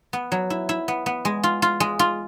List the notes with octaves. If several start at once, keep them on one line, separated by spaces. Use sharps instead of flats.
B3
F#3
E4
E4
B3
B3
G#3
F4
F4
G#3
F4